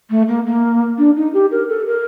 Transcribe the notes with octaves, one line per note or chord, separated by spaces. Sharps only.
A3
A#3
A#3
D4
D#4
G4
A#4
A4
A#4